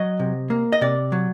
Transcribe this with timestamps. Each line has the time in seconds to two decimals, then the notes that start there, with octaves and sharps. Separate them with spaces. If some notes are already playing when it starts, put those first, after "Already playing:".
Already playing: F#3 D#5
0.19 C3
0.50 A#3
0.72 D#5
0.81 C3 D5
1.12 F#3